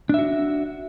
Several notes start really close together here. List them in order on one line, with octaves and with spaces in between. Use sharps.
D4 E5 F#4